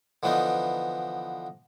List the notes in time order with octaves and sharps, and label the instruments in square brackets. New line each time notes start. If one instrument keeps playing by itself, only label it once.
[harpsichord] D3 E3 F3 B3 D4 D#4